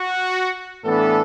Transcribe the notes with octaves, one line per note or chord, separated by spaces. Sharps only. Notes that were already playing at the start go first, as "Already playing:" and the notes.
Already playing: F#4
A2 E3 B3 D4 A4